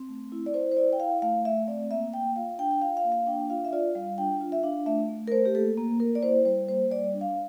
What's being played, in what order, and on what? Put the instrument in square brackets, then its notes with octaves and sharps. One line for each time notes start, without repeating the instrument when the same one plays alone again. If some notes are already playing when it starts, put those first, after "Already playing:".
Already playing: [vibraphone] C4
A3
E4
D5
E4 C5
C5
E4 D5
G5
E4 F5
A3 F5
A3 E5
C4 D5
A#3 E5
A#3 G5
F4 F5
D4 G5
G5
F4 F5
F5
A#3
F5
D4 G5
F4 F5
E5
F4 D5
G3 F5
D4 G5
F4
E5
D4 F5
A3 E5
A3
A#4
A3 C5
G4
A#3 A4
A#3
A#3 A#4
D5
E4 C5
G3 C5
A#3 C5
G3 D5
D4
F5